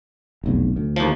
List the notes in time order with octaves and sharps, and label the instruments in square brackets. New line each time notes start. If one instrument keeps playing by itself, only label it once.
[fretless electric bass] F1 B1 E2
D2
[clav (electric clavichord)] D#2 F3